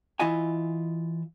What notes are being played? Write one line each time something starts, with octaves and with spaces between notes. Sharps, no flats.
E3 E4 F4 D#5 G#5